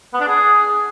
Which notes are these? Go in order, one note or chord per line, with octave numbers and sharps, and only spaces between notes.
B3
D4
G#4